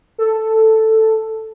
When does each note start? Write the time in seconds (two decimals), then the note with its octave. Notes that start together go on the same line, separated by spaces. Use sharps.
0.18 A4